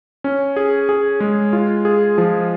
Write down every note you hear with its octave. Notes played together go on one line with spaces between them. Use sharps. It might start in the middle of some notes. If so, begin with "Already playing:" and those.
C#4
G#4
G#4
G#3
F4
G#4
F3